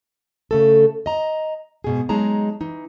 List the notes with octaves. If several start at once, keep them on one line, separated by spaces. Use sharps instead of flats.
C#3 A3 A4
D#5 A#5
G#2 B2 G#4
F#3 G#3 D#4 G#4 A5 A#5
E3 D#4